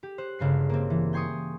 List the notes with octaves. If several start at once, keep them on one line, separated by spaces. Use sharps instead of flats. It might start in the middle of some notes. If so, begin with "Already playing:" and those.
G4
C5 F#6
G1 C#3 G#3 C7
A#3 C4
E3
G5 G#5 C6 C#6 D#6